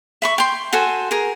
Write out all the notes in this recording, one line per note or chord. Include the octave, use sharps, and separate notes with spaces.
E5 B5 C#6
G5 C6
F#4 A4 C5 G#5
G#4 A#4